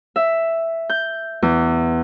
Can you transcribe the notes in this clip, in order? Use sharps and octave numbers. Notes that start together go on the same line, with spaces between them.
E5
G6
E2